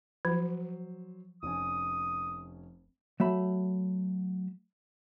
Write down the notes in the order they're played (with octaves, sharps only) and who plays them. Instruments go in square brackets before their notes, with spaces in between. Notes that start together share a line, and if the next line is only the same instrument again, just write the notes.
[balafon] F3 [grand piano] F#3 C5
[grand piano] F1 C#4 G#5 [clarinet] D#6
[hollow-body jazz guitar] F#3 A3 E5 B5